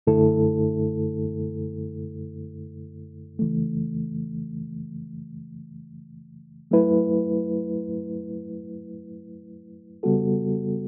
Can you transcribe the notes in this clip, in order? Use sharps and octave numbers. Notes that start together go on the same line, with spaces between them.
F#2 D3 A3 E4 A4
C#3 E3 A3
F#3 A3 E4 B4
C#3 G3 B3 F#4 A4